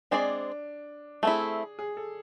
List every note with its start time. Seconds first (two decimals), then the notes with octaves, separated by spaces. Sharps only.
0.11 G#3 C4 D4 G#4 D5
1.23 A3 C4 E4 G#4
1.79 G#4
1.97 A4